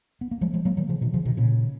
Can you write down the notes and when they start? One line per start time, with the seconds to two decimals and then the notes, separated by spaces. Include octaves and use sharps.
0.21 B3
0.31 A#3
0.41 F3 G#3
0.54 F3 G#3
0.65 F#3 A#3
0.77 D#3 F#3
0.89 C#3 F3
1.01 B2 D#3
1.14 C#3 F3
1.25 B2 D#3
1.37 A#2 C#3